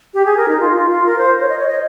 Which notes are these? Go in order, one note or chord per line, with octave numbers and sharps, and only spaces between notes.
G4
G#4
A#4
D#4
F4
F4
F4
A#4
C5
C#5
D#5
C#5
D#5